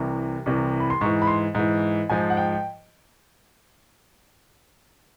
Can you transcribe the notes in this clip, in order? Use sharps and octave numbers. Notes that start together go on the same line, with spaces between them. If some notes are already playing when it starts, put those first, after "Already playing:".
Already playing: C2 C3 E3
C2 C3 E3
B5
C6
G#2 E3 C#6
B5
C6
G#2 E3
G#2 F3 G#5
F#5
G5
G5